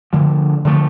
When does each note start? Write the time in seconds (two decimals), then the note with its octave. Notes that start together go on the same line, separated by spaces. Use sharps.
0.13 D3 F3 A3
0.65 D3 F3 A3